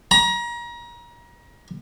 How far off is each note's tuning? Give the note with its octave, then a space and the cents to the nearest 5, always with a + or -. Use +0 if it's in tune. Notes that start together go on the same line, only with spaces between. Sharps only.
A#5 +35